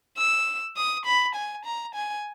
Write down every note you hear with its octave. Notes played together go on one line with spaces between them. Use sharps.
E6
D#6
B5
G#5
A#5
G#5